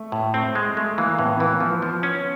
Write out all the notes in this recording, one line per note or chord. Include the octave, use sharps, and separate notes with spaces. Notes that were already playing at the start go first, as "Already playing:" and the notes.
Already playing: A3
A2
A3 C4
G#3
G#3 A3
A3
E3 A#3
A2 B3
B3
E3 A#3
F3 B3
F3
C#4